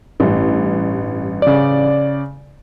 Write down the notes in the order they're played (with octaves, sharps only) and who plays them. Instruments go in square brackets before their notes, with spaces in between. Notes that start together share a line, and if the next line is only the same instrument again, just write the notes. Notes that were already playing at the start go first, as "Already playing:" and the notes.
[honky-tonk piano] A1 G2
[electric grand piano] C#3 D5